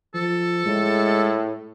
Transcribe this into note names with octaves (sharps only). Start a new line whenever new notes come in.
F3 A4
A2 G#3